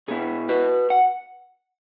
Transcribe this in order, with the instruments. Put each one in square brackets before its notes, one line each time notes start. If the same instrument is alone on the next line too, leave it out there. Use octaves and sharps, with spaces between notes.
[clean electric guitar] B2 B3 E4 G#4
F#4 B4
F#5